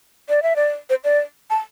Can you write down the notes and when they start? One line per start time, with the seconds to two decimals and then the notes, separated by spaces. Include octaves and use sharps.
0.29 D5
0.43 E5
0.56 D5
0.90 C5
1.04 D5
1.50 A5